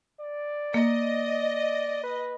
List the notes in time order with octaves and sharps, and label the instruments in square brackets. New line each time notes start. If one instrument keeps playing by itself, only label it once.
[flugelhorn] D5
[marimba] A#3 [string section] D#5
[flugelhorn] B4